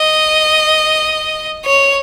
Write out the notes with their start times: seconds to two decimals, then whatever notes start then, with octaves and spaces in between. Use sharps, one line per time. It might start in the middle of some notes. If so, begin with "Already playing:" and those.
Already playing: D#5
1.66 C#5